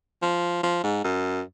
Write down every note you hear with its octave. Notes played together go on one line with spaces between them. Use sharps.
F3
F3
G#2
F#2